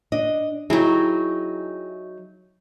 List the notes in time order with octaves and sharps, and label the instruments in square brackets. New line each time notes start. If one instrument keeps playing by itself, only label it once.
[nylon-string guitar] D4 D#5
[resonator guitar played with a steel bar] F#3 D#4 [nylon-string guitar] E4 G4 G#4